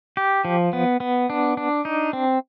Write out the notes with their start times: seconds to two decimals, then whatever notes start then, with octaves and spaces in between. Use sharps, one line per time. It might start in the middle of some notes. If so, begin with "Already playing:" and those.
0.17 G4
0.45 F3
0.73 B3
1.00 B3
1.30 D4
1.57 D4
1.85 D#4
2.13 C4